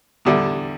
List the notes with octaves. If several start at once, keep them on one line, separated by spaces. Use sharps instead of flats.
E2 D3 G3